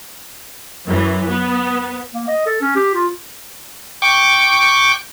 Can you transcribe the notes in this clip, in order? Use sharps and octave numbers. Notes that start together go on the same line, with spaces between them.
F#2 E3
B3
A#3
D#5
A4
C#4
G4
F4
G5 C#6 D6